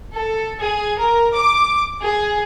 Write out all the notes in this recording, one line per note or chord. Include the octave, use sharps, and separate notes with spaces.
A4
G#4
A#4
D6
G#4